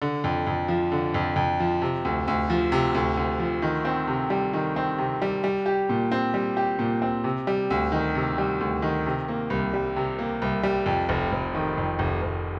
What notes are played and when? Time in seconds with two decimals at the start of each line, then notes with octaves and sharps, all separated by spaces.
0.02 D3
0.24 F2
0.47 F2
0.68 F3
0.92 D3
1.14 F2
1.36 F2
1.60 F3
1.82 C3
2.05 D2
2.28 D2
2.50 F3
2.72 C3
2.95 D2
3.17 D2
3.40 F3
3.62 D#3
3.85 C4
4.07 C3
4.30 G3
4.53 D#3
4.76 C4
4.98 C3
5.22 G3
5.44 G3
5.66 G4
5.89 A#2
6.12 C4
6.34 G3
6.57 G4
6.79 A#2
7.02 C4
7.24 C3
7.47 G3
7.70 D2
7.92 D#3
8.15 C3
8.38 G3
8.60 D2
8.82 D#3
9.06 C3
9.28 A#3
9.50 C2
9.73 G3
9.96 C3
10.19 A#3
10.42 C2
10.63 G3
10.86 F2
11.09 F1
11.32 F1
11.55 D#3
11.78 F2
11.99 F1
12.22 F1